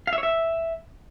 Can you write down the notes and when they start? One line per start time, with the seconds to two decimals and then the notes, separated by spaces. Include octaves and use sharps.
0.07 F5
0.13 E5
0.18 C#5
0.23 E5